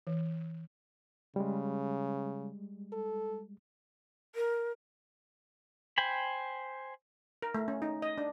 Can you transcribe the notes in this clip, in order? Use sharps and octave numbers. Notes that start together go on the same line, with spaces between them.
E3
C#3 G3 G#3
A4
A#4
C5 G5 G#5 B5
A#4
A3
C#4
D#4
D#5
D4